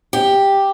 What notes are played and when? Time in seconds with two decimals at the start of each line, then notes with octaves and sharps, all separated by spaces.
0.13 G4